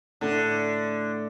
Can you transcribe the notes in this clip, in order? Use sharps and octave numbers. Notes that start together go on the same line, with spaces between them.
A2 D3 A3 D4